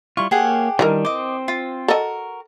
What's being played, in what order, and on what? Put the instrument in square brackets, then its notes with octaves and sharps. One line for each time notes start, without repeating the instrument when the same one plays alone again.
[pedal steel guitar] G3 E4 F4 [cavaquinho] C#6
[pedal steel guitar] A#3 C#5 [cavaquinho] G4 G#4 F#5
[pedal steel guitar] D#3 G3 D4 [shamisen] E3 D#4 A#4
[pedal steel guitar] C4 C5 [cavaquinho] D#5 D6
[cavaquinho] F4
[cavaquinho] F#4 A#4 [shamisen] A4 D#5